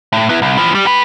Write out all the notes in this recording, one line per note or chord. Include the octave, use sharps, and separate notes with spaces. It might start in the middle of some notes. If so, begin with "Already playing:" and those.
A2
B3 E4
C2
E3 F3
G3
G4 B4